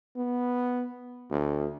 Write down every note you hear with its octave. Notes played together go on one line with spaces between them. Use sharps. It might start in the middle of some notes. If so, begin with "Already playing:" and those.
B3
D2